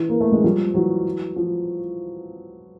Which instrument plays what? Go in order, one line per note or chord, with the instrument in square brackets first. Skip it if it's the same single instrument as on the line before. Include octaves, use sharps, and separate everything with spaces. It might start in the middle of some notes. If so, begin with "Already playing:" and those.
Already playing: [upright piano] E3
A#3
A3
G#3
F3 G3
E3 F#3
F3